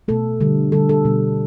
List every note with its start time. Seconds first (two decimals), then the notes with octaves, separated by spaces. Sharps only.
0.08 B2 A3 A4
0.41 D3 G3
0.72 D3 G3 A4
0.89 A4
1.05 B2 G3